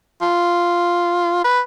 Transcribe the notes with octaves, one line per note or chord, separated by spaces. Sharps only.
F4
B4